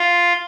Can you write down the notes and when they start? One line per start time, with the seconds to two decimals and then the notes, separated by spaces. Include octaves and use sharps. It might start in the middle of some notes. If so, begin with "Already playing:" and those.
Already playing: F4